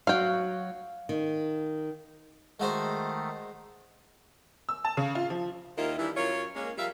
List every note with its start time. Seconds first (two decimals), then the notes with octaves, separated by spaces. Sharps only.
0.07 F#3 F#4 F5 G5
1.09 D#3
2.60 D#3 G#3 A3 F#4 C5
4.69 E6
4.85 A5
4.97 C#3
5.15 F4
5.30 F3
5.78 D#2 D#3 E4 F4 A#4 D#5
5.99 D#3 E3 G3 D4 E4
6.17 F#2 F4 A#4 C#5
6.56 G#3 A#3 C#4
6.77 F3 G3 A#4 E5 F5